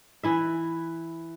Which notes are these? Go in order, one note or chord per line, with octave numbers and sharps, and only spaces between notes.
E3 E4 E5